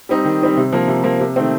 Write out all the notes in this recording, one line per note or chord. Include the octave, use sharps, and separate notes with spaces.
G3 C4 D#4
D#3
G3 C4 D#4
C3
F3 A#3
C3
F3 A#3
C3
D#3 A3 C4